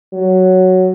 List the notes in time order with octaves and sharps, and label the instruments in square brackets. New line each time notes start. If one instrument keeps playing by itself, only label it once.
[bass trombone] F#3